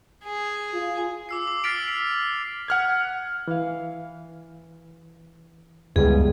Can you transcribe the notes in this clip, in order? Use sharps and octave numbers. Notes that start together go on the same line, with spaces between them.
G#4
F4
D6 E6 C7
D6
F6 A6 B6 C7 D7 F7
B6
F#5 F6 G#6
E3 F5
C#2 F#2 E3 G3 B3 G#4